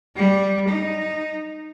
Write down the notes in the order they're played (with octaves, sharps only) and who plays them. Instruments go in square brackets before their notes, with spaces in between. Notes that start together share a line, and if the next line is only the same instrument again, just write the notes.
[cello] G3
D#4